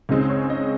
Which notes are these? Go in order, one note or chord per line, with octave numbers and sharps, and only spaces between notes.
C#2 C#3 G#3 C4 D#4
C#5
D#5